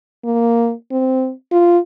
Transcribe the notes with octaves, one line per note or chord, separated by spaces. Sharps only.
A#3
C4
F4